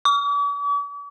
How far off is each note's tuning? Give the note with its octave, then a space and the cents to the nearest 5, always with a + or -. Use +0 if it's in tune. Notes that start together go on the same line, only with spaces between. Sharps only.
D6 -45